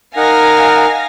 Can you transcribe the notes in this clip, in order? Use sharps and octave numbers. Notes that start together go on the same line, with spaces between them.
D#4 A#4 F5 F#5 G#5 A#6